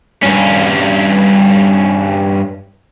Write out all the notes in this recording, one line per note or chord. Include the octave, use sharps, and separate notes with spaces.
G2 C#4